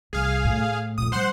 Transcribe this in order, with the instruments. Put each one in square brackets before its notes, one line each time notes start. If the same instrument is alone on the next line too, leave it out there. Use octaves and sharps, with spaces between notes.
[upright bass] C2 [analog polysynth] G#4 F5
[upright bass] A2
[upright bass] A#2 A3 [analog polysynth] D#6
[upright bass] D#3 G3 [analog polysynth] C5 F#5 C6